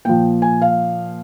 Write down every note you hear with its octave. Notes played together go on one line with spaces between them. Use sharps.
A#2 F3 G5
G#5
F5